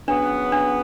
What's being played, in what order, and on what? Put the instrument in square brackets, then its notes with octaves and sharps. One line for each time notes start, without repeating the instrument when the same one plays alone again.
[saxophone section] C#3 F#3 B3 [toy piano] D4
[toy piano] D4